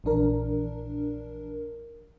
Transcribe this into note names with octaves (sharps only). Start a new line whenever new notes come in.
A#1 E3 D4 A#4